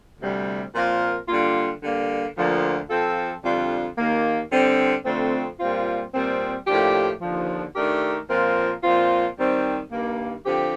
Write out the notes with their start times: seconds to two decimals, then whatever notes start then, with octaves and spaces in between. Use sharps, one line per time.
0.20 D2 C3 G3
0.73 A#2 F3 C4 F4 A#4
1.28 D3 G3 A#3 F4
1.81 D3 G3 A#3
2.36 D2 D3 F3 A#3
2.89 F3 C4 F4 A4
3.43 F2 D3 G3 D4 F4
3.98 D#2 D#3 A#3
4.51 D3 G3 C4
5.05 F2 D3 A3 C4
5.59 A#2 G3 C4 F4
6.13 A#2 G3 C4
6.67 A2 F3 A#3 D4 G4
7.21 D#2 D3 F3
7.76 D#3 A3 D4 G4 A#4
8.29 A#2 F3 C4 F4 A#4
8.83 A#2 F3 C4 F4
9.37 D#3 G3 C4
9.91 G2 D#3 A#3
10.45 D3 F3 C4 G4